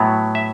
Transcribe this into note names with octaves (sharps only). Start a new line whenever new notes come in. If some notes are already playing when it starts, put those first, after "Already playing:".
Already playing: A2 F#3 B3
E5